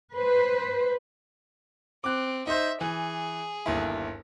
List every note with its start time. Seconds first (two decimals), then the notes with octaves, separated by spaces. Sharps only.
0.14 B4 C5
2.04 C4 D6 F#6
2.47 D#4 C5 E5
2.81 E3 G#4
3.66 G1 D#2 E4